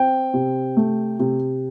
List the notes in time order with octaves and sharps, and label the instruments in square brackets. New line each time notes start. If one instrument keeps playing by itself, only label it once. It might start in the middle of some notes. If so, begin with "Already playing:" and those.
Already playing: [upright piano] C4 G5
C3
A3
C3